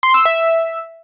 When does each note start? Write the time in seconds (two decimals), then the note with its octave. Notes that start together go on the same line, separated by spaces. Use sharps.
0.03 C6
0.14 E6
0.25 E5